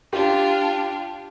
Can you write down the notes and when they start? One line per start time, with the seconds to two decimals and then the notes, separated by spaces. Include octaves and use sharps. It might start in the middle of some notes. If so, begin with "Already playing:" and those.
0.13 D4 F4 G4